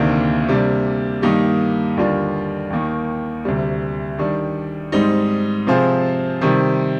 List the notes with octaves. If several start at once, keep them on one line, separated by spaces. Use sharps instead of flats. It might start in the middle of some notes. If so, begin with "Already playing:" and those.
Already playing: D2 C3 D#3 A#3 D4
C3 G3 A#3 D4
G2 D#3 A#3 D#4 G4
D#2 D3 G3 D4 F4
D#2 D#3 A#3
D2 C3 G3
D#3 G3 D4
G#2 G3 C4 D#4
C3 F3 C4 F4 G#4
C3 D#3 G3